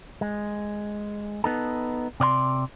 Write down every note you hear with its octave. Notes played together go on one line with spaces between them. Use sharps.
G#3
B3 D#4 A4
C3 D5 F5 C6